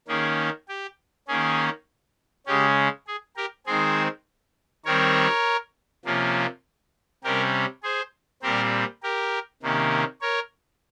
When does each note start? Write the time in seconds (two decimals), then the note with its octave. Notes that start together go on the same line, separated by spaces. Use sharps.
0.08 D#3 A#3 C#4 G#4
0.69 G4
1.28 D#3 A#3 C#4 G#4
2.46 C#3 G#3 C#4 G4
3.07 G#4
3.36 G4 A#4
3.66 D#3 G#3 C4 G#4 C5
4.85 D#3 G3 C4 A#4 C#5
6.05 C3 F3 A#3 C#4
7.24 C3 G3 C#4 G4 A#4
7.83 G#4 C5
8.42 A#2 G3 C4 G4 A#4
9.03 G4 A#4
9.63 C3 D#3 A#3 C#4
10.21 A#4 C#5